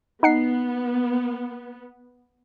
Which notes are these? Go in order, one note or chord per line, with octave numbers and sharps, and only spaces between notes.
B3 D#4 F#5 C7